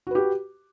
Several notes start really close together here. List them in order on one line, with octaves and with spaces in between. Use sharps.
F#4 B4 G4